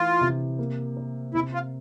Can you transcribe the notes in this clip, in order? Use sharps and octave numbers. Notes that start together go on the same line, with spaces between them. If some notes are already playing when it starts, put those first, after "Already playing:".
Already playing: E3 A3 F4
C3
A#3
A#4
C3 E4
F4